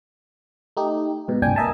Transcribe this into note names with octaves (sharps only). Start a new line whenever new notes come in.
A3 D#4 G4
G#2 B2
G1 C2 A#2 D4 G5 G#5
A#4 D#5 E5 G#5 A5